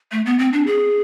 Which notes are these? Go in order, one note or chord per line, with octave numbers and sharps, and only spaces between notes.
A3
B3
C4
D4
G#4